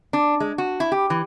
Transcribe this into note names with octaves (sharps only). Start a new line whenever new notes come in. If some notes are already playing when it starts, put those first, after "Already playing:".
D4
G#3
F#4
E4
G4
E3